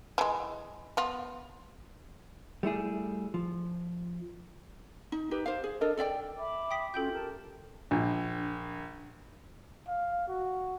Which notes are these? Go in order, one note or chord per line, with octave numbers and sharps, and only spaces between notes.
E3 G#3
B3 F4
G3 A3 E4 G#4
F3
D#4
D#4 G4 B4
C5 F5
G#4
D4 A4 A#4 D#5
A4 D5 E5 G5
E5 B5 D6
G5 D#6 B6
C#4 F4 F#4 A4 G5 G6
G4 A#4 A5
A#1 D4
F5
F#4